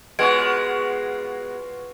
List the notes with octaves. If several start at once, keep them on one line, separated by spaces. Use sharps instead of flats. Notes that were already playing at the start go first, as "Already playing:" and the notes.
G#3 B3 F4 F#4 B4 C#5 G#6 D7